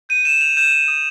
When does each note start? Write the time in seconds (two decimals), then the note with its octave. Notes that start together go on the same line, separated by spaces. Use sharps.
0.09 G6 D#7
0.25 G6 E7
0.40 G6 F7
0.57 G6 E7
0.73 G6
0.88 D#6